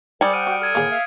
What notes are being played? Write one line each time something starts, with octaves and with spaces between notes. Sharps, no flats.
G3 A#4 C5 D5 G#5 D#6 C#7
C5 F#5 G5 F6 D7 D#7
F#4
A4 F6 G#6 D#7
A2 D3 D#3 A#3 G#4
E5 F5